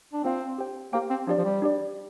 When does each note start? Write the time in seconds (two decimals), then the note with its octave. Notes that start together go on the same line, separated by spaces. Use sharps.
0.13 D4
0.24 A#3 C4 F4 C5 F5
0.58 G4 C5 G5
0.93 A#3 G4 C5 G5
1.10 C4
1.27 F3 D4 G4 D5
1.38 F3
1.45 G3
1.62 D4 G4 D5